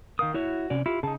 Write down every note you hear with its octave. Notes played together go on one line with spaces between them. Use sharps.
D#3 A#4 F5 G5 D#6
E4 F#4 C#5 E5
C3 C#4 D5
E4 F4 G4
C#3 D#4 G#4 A5